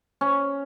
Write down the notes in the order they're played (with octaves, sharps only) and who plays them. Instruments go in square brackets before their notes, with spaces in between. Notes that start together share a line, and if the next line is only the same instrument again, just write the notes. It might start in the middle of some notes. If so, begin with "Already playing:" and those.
[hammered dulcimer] C#4